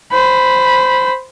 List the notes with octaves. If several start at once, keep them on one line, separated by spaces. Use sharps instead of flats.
C5 B5